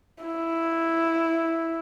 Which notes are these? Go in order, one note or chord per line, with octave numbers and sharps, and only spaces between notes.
E4